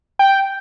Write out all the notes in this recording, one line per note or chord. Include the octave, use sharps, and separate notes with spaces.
G5